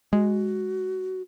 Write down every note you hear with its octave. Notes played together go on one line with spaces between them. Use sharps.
G#3 F#4